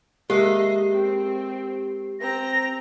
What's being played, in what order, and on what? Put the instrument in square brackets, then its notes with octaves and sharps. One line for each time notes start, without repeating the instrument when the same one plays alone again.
[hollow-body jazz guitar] G#3 A#3 [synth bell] G4 C7 [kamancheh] D#5 E5
[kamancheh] C4
[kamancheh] C4 A#5 [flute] A#6